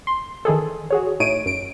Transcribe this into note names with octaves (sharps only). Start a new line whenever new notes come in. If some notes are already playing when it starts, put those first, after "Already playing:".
C6
D#3 E3 G#4 A4
F#4 G#4 C#5
A2 A3 D#4 C#5 D7 D#7
F#2 D7